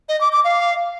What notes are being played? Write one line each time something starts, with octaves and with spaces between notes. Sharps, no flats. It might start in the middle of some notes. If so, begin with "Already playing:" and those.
D#5
D6
D6
F5